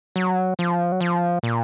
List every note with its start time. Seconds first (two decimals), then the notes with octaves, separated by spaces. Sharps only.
0.16 F#3
0.59 F3
0.92 F#3
1.01 F3
1.43 A#2